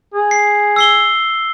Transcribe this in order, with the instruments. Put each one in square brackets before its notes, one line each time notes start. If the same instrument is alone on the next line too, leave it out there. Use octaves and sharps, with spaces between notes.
[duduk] G#4
[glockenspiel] C7
E6 C7 G7